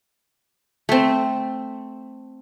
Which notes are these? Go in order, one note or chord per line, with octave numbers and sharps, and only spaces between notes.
A3 C4